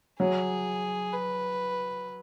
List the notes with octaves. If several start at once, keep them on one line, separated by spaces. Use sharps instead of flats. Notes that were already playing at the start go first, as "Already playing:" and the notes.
F#3 G#4
B4